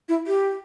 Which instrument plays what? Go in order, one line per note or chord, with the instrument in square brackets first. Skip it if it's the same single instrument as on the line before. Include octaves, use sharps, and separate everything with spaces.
[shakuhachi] E4
G4